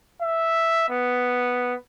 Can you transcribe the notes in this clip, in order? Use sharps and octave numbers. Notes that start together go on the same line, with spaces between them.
E5
B3